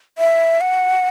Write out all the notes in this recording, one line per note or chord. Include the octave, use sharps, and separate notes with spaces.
E5
F#5